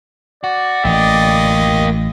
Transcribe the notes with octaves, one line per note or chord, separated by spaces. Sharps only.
F#4 D5
A1 A#3 G4 D#5